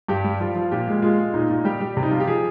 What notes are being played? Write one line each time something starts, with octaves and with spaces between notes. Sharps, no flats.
G2 G4
G3
F3 F4
F3
A#2 G4
G#3
G#3 F4
G#3
A#2 D#4
A#2
G3 G4
G3
C3
D#4
F3 F4
G4
F3 G#4